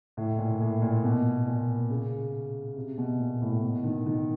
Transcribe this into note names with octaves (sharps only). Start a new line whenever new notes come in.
A2
A#2
A2
A#2
B2
A#2
C#3
C3
B2
A#2
A2
B2
D#3
D#3